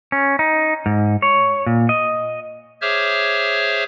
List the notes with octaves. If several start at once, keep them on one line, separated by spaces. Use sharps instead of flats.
C#4
D#4
G#2
C#5
A#2
D#5
G#4 C5 C#5 E5 D6 F6